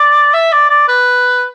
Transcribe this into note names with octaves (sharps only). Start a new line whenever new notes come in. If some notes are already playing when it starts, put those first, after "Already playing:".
Already playing: D5
E5
D5
D5
B4